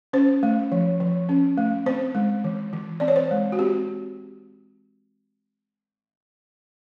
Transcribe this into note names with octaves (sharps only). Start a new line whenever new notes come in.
C#4 C5
A3
F3
F3
C#4
A3
C4 C5
G#3
E3
E3
C4 D5
C#5
C5
G#3
F#4
C4 G4